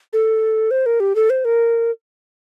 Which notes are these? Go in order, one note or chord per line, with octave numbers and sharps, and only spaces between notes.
A4
C5
A#4
G4
A4
C5
A#4